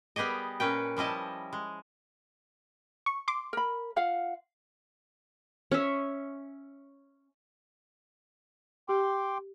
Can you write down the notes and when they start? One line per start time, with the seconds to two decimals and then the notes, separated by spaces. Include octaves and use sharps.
0.16 G3 B3 G4 G#4 D#5
0.60 A#2 C#4 B4 G5
0.97 F3 G3 E4 D#5 A5
1.53 G#3
3.06 C#6
3.28 C6 D6
3.53 A#4 B5
3.96 F4 F5 F#5
5.72 C#4 E5
8.89 G4 G5 C6 D6